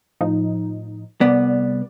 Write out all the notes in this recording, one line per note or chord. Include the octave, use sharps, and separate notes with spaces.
A2 F3 D#4
C2 B3 D5